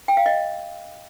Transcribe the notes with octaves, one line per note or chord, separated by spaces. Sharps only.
G5
F5
D#5